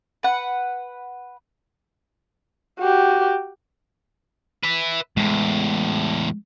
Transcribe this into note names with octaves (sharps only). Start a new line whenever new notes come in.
B4 F#5
F#4 G4
B4 E5
E2 A2 G#3